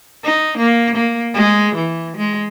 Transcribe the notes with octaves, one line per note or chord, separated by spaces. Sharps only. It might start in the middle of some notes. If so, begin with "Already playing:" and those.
D#4
A#3
A#3
G#3
E3
G#3